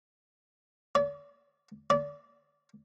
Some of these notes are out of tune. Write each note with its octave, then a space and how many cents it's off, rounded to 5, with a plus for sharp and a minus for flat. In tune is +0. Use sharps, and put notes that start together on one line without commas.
D5 -45
D5 -30